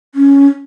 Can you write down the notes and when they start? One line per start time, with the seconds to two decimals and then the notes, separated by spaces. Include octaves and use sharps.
0.15 C#4